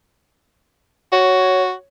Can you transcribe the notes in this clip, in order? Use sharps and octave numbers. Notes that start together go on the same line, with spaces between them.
F#4 C#5